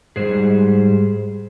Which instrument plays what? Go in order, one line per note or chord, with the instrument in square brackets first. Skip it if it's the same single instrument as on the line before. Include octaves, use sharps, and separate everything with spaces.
[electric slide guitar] G#2 G3 G#4 C5